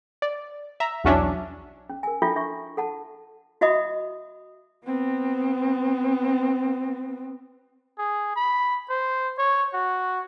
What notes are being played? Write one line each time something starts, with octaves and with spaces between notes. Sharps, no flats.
D5
E5 A#5
B1 E2 F#3 C#4 D4 E5
C#4
A#4 G#5
D4 E4 F4 A4 E5 G5
D4 E5 C#6
A4 F#5 A5
F#4 D#5 E5 B5 D#6
B3 C4
G#4
B5
C5
C#5
F#4